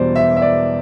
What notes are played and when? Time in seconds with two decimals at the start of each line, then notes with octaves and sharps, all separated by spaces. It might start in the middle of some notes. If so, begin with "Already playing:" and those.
Already playing: E1 E2 B2 G3 C5 D5
0.16 E5
0.37 E5
0.42 D5